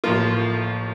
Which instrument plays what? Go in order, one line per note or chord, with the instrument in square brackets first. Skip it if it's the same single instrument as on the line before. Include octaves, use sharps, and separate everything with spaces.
[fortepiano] A1 A2 F3 A#3 F4